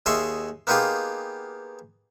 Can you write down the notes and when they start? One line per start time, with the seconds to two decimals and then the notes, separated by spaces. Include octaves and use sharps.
0.06 D#2 G#4 D#5 E5 C6 C#6
0.67 A#3 B3 D#4 F4 G4 G#4